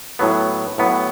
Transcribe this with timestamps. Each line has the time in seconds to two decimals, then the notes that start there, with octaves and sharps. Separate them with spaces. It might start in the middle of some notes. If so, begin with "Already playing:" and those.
0.19 A2 F#3 B3
0.78 A2 F#3 B3